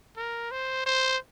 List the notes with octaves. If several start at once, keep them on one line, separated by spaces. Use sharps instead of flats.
A#4
C5
C5